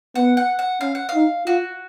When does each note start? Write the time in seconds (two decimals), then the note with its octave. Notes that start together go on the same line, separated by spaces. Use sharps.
0.15 B3 F#5
0.37 F#5
0.59 F#5
0.81 C#4 F5
0.95 F#5
1.09 F5
1.14 D#4
1.47 F4 F#4